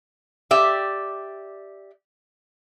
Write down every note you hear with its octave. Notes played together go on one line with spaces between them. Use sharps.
G4 D5 E5